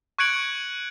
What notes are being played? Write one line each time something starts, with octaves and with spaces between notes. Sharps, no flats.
C#6 F#6 G#6 C#7 D7 F#7